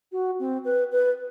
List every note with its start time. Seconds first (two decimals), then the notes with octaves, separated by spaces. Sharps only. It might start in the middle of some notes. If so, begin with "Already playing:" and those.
0.12 F#4
0.39 C4
0.65 B4
0.92 B4